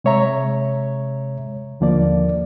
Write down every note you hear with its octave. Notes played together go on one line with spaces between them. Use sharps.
C3 G#3 C#5 E5 A#5
D#2 D3 F3 A#3 D5